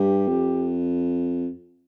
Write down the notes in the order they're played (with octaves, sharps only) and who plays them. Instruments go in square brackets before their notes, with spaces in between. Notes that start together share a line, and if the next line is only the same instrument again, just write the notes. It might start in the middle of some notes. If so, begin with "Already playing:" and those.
Already playing: [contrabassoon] G2 [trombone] G4
[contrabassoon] F2